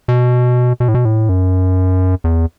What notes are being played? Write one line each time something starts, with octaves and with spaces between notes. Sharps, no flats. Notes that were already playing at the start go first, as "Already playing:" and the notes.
B2
B2
A2
B2
A2
F#2
E2